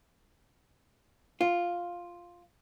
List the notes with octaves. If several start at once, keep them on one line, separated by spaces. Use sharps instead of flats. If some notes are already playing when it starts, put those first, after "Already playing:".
F4